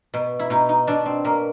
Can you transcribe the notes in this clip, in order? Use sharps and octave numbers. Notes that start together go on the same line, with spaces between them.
B2
E4
B2 D#4
D#4
B2 D4
C4
B2 A#3